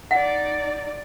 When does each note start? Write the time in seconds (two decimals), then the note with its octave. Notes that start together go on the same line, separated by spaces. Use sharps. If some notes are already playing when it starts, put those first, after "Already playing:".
0.11 D#4 D5 F#5